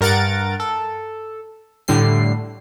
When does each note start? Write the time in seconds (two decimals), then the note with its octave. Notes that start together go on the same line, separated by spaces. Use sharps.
0.01 G2 A#4 F#5 A6 D7
0.60 A4
1.88 A2 D3 G3 C7